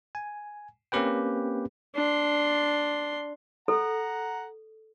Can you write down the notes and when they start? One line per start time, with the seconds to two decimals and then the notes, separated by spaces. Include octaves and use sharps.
0.15 G#5
0.92 A#3 C4 C#4 G4 B4 G5
1.96 D4 C6
3.68 A4 F#5 A#5